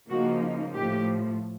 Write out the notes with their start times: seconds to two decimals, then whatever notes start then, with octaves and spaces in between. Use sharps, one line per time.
0.09 C#3 F3 A#3 D#4 F#4
0.76 A2 F3 A3 G4